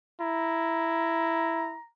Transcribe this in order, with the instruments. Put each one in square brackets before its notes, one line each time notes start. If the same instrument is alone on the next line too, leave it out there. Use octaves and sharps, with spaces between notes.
[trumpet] E4 [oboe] A#5